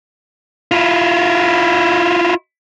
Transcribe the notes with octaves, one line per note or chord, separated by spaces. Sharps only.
E4 F4